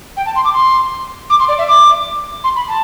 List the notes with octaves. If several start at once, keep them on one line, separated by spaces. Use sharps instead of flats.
G5
A5
C6
D6
C6
D6
C6
D5
E5
D6
C6
B5
A5